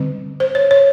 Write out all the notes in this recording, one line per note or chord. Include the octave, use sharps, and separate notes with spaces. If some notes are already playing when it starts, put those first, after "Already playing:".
Already playing: D3 G3 C4
C5
C#5
C#5